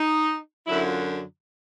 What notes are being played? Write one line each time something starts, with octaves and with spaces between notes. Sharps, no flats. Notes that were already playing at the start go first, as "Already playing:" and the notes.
Already playing: D#4
F#2 D3 F#3 E4
F4